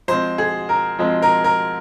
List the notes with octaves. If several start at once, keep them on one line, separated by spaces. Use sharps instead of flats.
F3 G#3 C4 C5
G#4
A#4
F3 G#3 C4
A#4
A#4